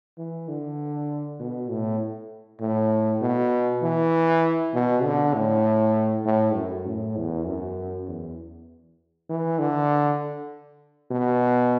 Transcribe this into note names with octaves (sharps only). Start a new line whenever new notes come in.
E3
D3
B2
A2
A2
B2
E3
B2
D3
A2
A2
F#2
A2
E2
F#2
E2
E3
D3
B2